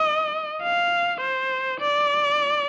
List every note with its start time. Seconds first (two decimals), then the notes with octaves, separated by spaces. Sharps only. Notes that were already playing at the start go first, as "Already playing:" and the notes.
Already playing: D#5
0.63 F5
1.21 C5
1.80 D5